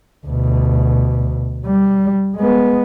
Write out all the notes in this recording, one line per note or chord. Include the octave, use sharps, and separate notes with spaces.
D2 B2
G3
G#3 B3